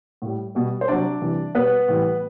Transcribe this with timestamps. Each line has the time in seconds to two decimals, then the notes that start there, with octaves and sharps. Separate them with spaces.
0.22 A2 G3
0.55 B2 G3
0.81 C5
0.88 C3 F#3 D4 D5
1.21 C3 E3 G3
1.55 B2 G3 B3 B4
1.88 A2 E3 G3